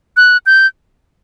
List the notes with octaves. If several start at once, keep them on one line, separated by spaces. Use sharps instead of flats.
F#6
G6